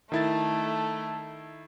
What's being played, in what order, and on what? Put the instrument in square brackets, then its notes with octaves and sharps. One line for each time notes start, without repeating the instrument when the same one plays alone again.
[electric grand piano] D#3 E4 A6 [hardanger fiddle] A3 [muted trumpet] A4